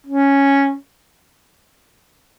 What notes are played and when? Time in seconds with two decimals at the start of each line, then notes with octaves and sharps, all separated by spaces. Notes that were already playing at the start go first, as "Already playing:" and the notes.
0.07 C#4